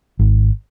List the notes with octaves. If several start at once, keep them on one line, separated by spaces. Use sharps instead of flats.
G#1